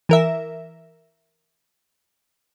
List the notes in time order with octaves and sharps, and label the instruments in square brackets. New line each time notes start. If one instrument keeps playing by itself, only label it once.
[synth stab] E3 A#4 E5